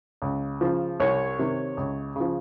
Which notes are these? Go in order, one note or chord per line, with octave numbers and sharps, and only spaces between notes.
C#2
C#3 F3
C2 C#5
C3 D#3
C#2
C#3 F3